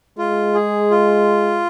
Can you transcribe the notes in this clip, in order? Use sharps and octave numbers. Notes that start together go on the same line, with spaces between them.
G#3 F4
G#4
F4